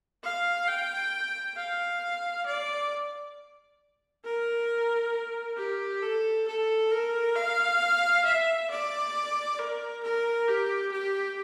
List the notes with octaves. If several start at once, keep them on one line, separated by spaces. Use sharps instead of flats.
F5
G5
F5
D5
A#4
G4
A4
A4
A#4
F5
E5
D5
A#4
A#4
G4
G4